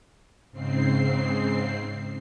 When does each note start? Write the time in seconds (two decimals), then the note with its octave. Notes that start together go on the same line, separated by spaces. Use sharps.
0.51 G#2 C#3 C4 C7